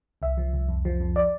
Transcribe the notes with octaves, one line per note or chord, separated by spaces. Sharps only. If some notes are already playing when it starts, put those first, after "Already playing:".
C2 E5
F3
C2
F2
F3
F2
D5